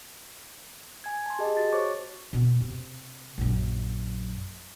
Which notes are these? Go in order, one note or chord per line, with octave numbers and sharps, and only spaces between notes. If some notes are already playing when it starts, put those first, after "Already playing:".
G#5 G#6
A5 C6
G4 G#4 D#5 A5
F#4 A6
C5 C#5 C#6 D6
B2 B3
C3
A#1 F#2